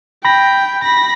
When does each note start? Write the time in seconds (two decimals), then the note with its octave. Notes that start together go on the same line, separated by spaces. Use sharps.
0.25 G5 B5 A#6
0.83 B5 A#6